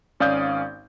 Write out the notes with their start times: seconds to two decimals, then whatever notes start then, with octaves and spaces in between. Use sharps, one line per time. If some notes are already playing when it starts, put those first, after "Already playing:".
0.20 G#1 C#4 D5 F5 D#6 G6